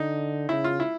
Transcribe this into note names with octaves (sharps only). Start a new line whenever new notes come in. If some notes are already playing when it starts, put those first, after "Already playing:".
Already playing: D3 D#4
C#3 E4
F4
E4